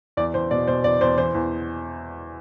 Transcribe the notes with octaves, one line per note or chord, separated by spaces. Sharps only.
E2 D5
E2 C5
B2 D5
B2 C5
E2 D5
E2 C5
E3 C5
E2